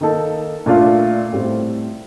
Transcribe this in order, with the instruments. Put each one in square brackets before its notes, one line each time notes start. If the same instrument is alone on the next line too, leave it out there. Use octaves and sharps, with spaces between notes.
[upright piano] D#3 A#3 D#4 A4
A#2 A3 D4 F4 A4
A2 G3 C4